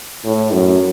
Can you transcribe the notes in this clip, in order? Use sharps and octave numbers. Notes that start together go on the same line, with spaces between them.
A2
F#2